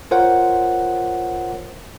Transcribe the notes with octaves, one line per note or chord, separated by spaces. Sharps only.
F4 A#4 C5 C#5 F#5